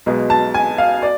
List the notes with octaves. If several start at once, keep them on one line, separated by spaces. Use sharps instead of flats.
B1 B2 G#3
A5
G#5
F5
D5